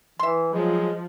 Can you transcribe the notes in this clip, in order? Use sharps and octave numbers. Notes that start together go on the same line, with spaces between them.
E3 E5 C6
F3 F#3 G#3